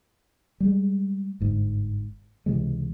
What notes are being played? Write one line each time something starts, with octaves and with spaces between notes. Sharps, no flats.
G3 G#3
G1 G#2
C#2 C3 E3 G#3